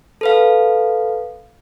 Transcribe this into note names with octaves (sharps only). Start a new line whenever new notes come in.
A4 B4 F5